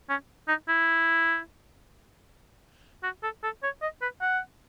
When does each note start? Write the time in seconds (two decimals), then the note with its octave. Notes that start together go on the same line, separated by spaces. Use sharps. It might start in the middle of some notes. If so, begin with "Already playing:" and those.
0.09 C#4
0.48 D#4
0.68 E4
3.03 F#4
3.23 A4
3.43 A4
3.63 C#5
3.82 D#5
4.02 B4
4.21 F#5